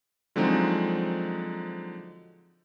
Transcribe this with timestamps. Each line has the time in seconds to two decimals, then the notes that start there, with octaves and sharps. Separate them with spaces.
0.36 D3 F3 F#3 G#3 C4 D#4